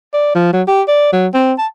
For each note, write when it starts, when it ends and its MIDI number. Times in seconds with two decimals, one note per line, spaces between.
0.14 0.35 74
0.35 0.52 53
0.53 0.63 54
0.67 0.82 67
0.88 1.12 74
1.13 1.27 54
1.34 1.53 60
1.58 1.67 81